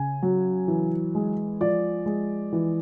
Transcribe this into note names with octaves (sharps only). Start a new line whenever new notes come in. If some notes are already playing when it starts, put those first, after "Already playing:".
Already playing: C#3 G#5
F#3
E3
G#3
F3 D5
G#3
E3